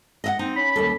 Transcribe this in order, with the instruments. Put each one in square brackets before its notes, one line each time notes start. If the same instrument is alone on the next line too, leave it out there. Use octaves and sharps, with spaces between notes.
[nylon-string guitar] D#5 E5 F#5
[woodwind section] C4 [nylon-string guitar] D#4
[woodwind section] C#4 B5
[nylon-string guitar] D#2 G3 A4